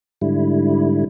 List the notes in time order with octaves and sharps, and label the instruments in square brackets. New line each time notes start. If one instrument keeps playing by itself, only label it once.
[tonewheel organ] G#2 D3 G3 E4